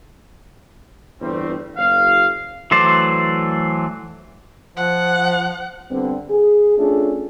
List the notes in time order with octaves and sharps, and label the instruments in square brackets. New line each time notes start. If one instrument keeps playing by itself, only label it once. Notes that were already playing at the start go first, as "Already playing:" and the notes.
[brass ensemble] G1 E2 G2 G3 A3 C4
F#1 F5
[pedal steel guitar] E3 F#3 A3 C5 D5
[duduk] F3 [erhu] F#5
[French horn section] D3 G3 B3 C4
G#4
A3 C#4 D4 F4 G#4 A4